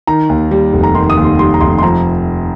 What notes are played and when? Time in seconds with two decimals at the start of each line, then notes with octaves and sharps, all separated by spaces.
0.07 D#3 A#5
0.29 D#2
0.51 G3
0.73 F1
0.83 A#5
0.95 D#3 C6
1.10 D#6
1.17 D#2
1.24 C6
1.39 G3 C6
1.54 A#5
1.61 F1 C6
1.78 C6
1.83 F3 A#5